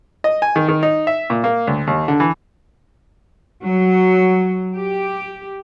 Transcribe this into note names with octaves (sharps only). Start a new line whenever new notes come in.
D#5
G#5
D#3
D#3
D#4
E5
A#2
A#3
D2
D#2
D3
E3
F#3
G4